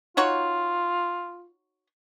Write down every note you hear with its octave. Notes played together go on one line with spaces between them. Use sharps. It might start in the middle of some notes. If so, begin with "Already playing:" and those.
D#4 F4 F#4 C#5